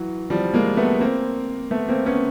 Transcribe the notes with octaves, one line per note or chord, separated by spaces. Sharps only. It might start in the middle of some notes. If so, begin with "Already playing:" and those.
Already playing: E3 F#3
F3 G3
G#3 A#3
A3 B3
A#3 C4
A3 B3
A#3 C4
B3 C#4